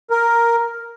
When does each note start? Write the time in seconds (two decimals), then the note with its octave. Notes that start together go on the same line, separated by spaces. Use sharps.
0.10 A#4